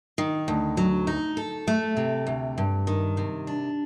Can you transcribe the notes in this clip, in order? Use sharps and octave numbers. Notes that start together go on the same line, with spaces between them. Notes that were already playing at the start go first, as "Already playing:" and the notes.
D#3
D2
F#3
D#4
A4
A3
C3
D2
G2
D#3
C3
D4